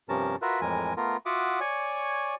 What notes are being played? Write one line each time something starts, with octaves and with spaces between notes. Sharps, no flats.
G2 C3 F3 C#4 A#4 A5
F4 F#4 A#4 B4 E5
F2 A2 E3 G#3 A#4 G#5
A3 B3 F4 A#4
F4 F#4 E5 F#5 D6 D#6
C#5 D5 G#5 C#6